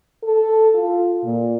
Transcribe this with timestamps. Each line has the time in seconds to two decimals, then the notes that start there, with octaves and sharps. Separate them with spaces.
0.24 A4
0.74 F4
1.25 A#2